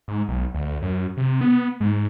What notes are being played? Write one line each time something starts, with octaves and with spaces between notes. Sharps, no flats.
G#2
B1
D2
F#2
C3
B3
G#2